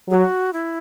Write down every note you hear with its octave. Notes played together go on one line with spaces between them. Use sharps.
F#3 G#4
F#4
E4